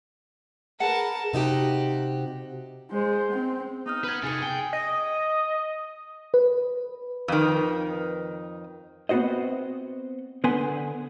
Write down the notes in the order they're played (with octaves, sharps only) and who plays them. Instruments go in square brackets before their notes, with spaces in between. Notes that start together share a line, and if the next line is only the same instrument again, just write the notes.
[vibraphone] G#4 [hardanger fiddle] A#4 A5 [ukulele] B4 F#5
[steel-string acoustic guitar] C3 D#4 F#4 G4
[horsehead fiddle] G#3 C5
C4
[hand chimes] B3 D#6 F6 [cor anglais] D#4
[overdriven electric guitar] B4 F#5 [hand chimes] F6 G#6
[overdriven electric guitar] C3 D#4 [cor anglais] G#4 [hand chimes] A6 C#7
[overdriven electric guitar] G5 [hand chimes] G#5
[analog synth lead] D#5
[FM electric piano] B4
[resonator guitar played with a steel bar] F2 D#3
[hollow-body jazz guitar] B3 C4 F#4 C5 D#5
D3 B3 B4 G#5 C6